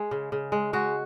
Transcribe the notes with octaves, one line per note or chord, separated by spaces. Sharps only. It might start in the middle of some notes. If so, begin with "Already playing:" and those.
Already playing: G#3 G#4
C#3
C#3
G#3
G#3 F#4